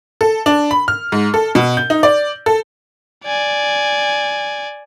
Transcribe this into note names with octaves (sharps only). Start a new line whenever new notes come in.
A4
D4
B5
F6
G#2
A4
B2
G6
D#4
D5
A4
D5 G#5